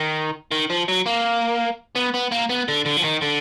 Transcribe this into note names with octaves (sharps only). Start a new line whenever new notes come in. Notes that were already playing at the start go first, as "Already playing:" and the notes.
Already playing: D#3
D#3
F3
F#3
A#3
B3
B3
A#3
B3
D3
D3
F3
D#3
D3